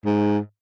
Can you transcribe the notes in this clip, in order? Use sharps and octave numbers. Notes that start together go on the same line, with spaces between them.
G#2